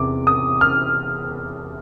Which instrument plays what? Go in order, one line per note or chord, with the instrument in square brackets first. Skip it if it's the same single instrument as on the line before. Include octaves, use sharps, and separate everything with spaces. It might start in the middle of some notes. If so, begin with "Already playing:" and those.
Already playing: [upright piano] E2 C3 D6
D#6
F6